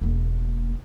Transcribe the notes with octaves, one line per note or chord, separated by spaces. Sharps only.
E1 A#3